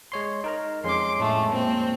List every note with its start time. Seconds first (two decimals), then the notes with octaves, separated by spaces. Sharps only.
0.12 G#3 C#5 C6
0.44 D#4 A#4 A#5
0.84 F2 G#3 C#4 C6 D6
1.17 A2 A3
1.51 A#2 C4